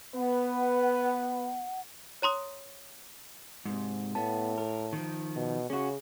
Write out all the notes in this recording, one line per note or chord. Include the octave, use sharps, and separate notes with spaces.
B3 B4 F#5
C#5 A#5 C6 D#6
G#2 C3
A2 B3 A5
A#4
D#3 F3
B2
C#3 C#4 F#4 G#4